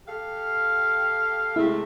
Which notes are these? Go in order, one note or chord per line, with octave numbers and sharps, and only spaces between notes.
G4 A4 F5
C3 G#3 A3 E4